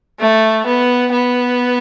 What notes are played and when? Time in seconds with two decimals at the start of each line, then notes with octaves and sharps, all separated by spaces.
0.19 A3
0.66 B3
1.13 B3